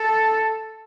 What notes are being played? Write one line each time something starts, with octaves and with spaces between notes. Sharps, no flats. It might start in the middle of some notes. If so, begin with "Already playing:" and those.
Already playing: A4